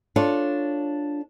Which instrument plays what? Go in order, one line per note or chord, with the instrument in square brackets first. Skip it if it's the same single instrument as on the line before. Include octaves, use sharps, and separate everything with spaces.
[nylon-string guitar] D4 F4 A4 C#5 D5